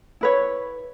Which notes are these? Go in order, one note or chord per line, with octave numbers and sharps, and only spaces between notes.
E4 B4 C#5